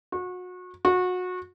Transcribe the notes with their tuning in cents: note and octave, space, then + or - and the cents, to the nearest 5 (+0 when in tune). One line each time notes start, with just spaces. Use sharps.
F#4 -30
F#4 -25